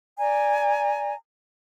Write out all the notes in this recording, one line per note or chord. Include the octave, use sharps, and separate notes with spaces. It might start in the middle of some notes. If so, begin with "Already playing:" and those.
D5 G#5 A#5